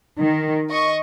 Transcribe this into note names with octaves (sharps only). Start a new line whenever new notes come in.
D#3
D#5 C#6